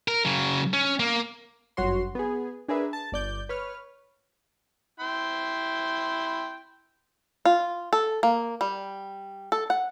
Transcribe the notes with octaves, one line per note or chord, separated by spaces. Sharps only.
A#4
C#3 F#3
C#4
A#3
G1 F#2 F#4 C#5 C6
B3 G#4
D4 G#4 A#4 B4 E5
A5
G1 D5 G6
B4 C#5 F6
E4 G5 C6
F4
A4
A#3
G3
A4
F#5